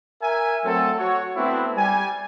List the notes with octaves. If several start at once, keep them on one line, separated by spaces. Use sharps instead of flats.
A#4 E5 G#5
F#3 A3 C4 A4
F#4 C#5
A3 B3 C4 D4 E4 F#4
G3 G#5